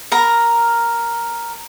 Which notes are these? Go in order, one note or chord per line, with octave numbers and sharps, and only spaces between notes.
A#4 A#5